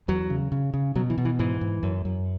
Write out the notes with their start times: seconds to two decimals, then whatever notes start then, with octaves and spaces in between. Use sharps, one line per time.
0.08 E2 F#3
0.30 C#3
0.52 C#3
0.74 C#3
0.95 B2 F#3
1.10 E3
1.18 B2
1.25 E3
1.39 G#2 E3
1.61 G#2
1.83 F#2
2.05 F#2